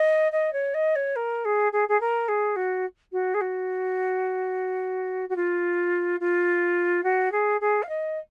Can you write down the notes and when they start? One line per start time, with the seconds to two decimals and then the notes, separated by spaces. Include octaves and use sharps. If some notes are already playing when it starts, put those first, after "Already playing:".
Already playing: D#5
0.32 D#5
0.53 C#5
0.74 D#5
0.96 C#5
1.16 A#4
1.45 G#4
1.72 G#4
1.89 G#4
2.01 A#4
2.28 G#4
2.56 F#4
3.12 F#4
3.34 G#4
3.41 F#4
5.29 F#4
5.36 F4
6.20 F4
7.04 F#4
7.32 G#4
7.61 G#4
7.83 F5
7.89 D#5